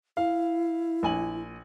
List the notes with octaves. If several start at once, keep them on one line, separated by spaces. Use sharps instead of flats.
E4 F5
A#1 G#5 F#7